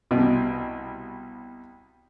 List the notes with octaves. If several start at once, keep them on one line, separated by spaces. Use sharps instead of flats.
C2 B2